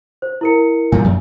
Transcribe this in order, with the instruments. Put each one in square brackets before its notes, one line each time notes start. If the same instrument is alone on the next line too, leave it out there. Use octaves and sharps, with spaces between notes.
[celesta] C5
E4 A#4 C#7
[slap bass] A#2 F3 G3 [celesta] G#5
[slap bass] F#2